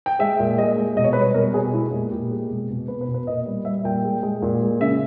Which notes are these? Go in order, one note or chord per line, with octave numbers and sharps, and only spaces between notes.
G5
G#3 E5
A#2
G#3 D#5
G#3
B2 D#5
C#5
B4
G3 C#5
B2 A#4
B2 G#4
G4
G#3 E4
A#2
A#2 G4
G#3
B2
B2
B2 B4
B4
B2
B4
A#2 D#5
G3
G3 E5
A#2 G5
G#3
G#3
A#2
G#3
C#3 E5